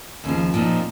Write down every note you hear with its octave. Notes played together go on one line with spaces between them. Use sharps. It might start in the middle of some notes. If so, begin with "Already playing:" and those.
D#2 C#3 F3
A#2 F3 C4 D#4